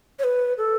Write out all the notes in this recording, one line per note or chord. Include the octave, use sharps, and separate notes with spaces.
C#5
B4
A4